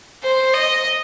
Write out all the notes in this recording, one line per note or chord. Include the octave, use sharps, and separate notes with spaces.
C5
D#5